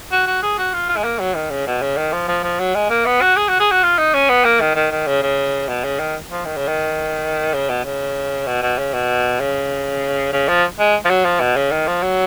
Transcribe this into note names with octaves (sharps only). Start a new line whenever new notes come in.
F#4
F#4
G#4
F#4
F4
F4
G#3
A#3
F#3
D#3
C#3
B2
C#3
D#3
F3
F3
F3
F#3
G#3
A#3
B3
F#4
G#4
F#4
G#4
F#4
F4
D#4
C#4
B3
A#3
D#3
D#3
D#3
C#3
C#3
B2
C#3
D#3
F3
D#3
C#3
D#3
C#3
B2
C#3
B2
B2
C#3
B2
C#3
C#3
F3
G#3
F3
F#3
F3
B2
C#3
D#3
F3
F#3